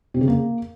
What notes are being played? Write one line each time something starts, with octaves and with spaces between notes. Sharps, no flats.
C3
C#3
A#3